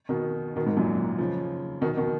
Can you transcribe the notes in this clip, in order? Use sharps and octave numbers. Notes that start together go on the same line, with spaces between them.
B2 D#3
B2 D#3
G#2
F#2 A#2
C#3 F3
B2 D#3
B2 D#3